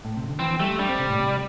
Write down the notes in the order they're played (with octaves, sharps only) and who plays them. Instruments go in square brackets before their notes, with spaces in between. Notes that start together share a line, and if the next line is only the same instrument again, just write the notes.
[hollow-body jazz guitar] A2
C3
D3
[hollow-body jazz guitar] E3 [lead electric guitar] C4
[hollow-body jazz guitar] G3 [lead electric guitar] A3
[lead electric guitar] G3 [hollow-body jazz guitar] D4
[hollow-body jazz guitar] C4
C3
A2
C3